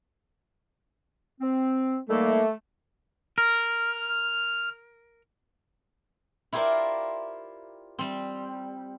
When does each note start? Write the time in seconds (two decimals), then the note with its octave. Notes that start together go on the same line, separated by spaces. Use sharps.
1.41 C4
2.09 D#3 G3 A3 A#3
3.38 A#4 F6
6.53 E4 F4 G4 A#4 C5 D5
7.99 G3 C4